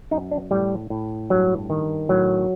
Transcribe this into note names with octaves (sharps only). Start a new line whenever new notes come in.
F#2 D#4
D4
A2 G3
A2
G2 F#3
D#3
A2 F#3